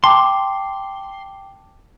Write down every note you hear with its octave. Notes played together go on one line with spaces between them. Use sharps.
G5 A5 C6 D6